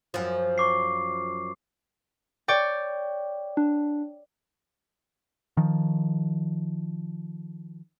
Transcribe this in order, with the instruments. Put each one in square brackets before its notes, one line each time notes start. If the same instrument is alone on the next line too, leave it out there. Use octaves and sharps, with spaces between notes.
[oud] F#2 F3
[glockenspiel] C#6 D6 C7
[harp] C#5 D5 G5
[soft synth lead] D4
[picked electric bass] D#3 F3